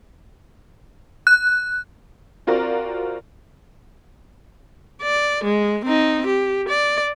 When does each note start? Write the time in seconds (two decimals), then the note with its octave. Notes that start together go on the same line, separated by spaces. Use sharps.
1.27 F#6
2.47 C4 F4 F#4 A#4 D5
5.02 D5
5.44 G#3
5.85 C4 D#4
6.26 G4
6.69 D5